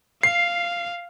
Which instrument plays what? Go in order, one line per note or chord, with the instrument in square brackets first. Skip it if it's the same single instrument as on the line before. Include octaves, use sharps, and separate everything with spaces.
[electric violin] F5 [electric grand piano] C7